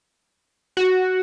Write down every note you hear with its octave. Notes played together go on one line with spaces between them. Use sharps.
F#4